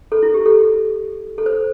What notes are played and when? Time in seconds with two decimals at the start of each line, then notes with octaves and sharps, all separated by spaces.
0.12 A4
0.22 E4
0.34 G4
0.46 A4
1.38 A4
1.46 C5